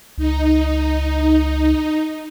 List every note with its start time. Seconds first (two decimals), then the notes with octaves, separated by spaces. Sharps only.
0.18 C#2 D#4